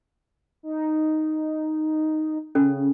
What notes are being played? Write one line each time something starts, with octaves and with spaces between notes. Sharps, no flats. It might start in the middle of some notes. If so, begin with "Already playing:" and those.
D#4
C#3 C#4 A4